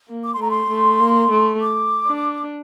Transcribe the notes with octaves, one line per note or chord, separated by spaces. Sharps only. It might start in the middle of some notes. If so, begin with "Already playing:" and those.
A#3
D6
C6
A3 A#5
C6
A3
A#3
A3
D6
D4